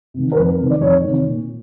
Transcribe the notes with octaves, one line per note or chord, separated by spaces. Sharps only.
C3 D#3
A#4
F2 B4
C3 D#3
D5
F2 C#5
C3 D#3
A#2